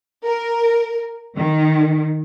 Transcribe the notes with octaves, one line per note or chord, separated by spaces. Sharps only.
A#4
D#3